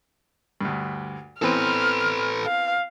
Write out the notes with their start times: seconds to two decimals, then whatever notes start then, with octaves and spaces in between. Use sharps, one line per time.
0.61 D2 G2
1.42 E3 B3 C4 A4 B4 F6
2.46 F5